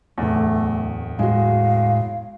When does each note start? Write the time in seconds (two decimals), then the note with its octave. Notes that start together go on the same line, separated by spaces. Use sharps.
0.18 D1 E2 A3
1.19 A2 G#3 F#4 F5